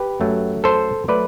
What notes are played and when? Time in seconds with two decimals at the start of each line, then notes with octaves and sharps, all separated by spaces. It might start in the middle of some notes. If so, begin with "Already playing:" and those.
Already playing: G4 B4
0.20 F#2 F#3 A3
0.64 A4 C5
1.08 F#3 A3 B4 D5